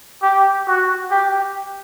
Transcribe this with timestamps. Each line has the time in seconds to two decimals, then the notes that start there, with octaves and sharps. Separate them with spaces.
0.22 G4
0.67 F#4
1.11 G4